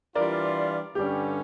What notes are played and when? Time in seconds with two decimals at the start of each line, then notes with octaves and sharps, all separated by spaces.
0.15 E3 G3 D4 F4 A#4 D5
0.95 G2 D3 G3 C#4 G4